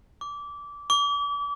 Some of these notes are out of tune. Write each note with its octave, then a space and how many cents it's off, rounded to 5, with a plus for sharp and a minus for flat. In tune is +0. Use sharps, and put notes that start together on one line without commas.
D6 -20
D6 -35